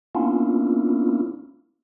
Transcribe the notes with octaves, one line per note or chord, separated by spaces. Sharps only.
A#3 B3 C#4 D4 E4 F4